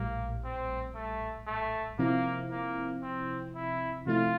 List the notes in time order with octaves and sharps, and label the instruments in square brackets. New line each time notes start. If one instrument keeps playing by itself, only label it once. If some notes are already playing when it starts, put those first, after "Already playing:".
Already playing: [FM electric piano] A#1 A2 G3 [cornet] A#3
[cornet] C4
A3
A3
[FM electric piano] C3 F3 C4 E4 [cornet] A#3
[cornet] A#3
C4
E4
[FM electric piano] C3 F3 A3 E4 [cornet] F4